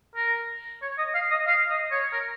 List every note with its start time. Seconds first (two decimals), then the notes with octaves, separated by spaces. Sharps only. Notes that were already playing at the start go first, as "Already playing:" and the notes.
0.16 A#4
0.82 C#5
0.98 D#5
1.15 F5
1.31 D#5
1.48 F5
1.69 D#5
1.91 C#5
2.13 A#4